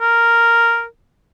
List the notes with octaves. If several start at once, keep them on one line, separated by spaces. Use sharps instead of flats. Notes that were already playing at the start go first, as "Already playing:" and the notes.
A#4